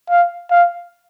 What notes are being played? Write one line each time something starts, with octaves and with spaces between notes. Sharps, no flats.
F5
F5